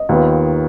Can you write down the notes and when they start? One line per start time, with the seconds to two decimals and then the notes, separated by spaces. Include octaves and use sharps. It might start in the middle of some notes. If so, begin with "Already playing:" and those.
Already playing: D#5
0.09 D#2 D#3 B3 F4